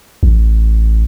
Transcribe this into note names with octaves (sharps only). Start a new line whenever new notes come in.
A1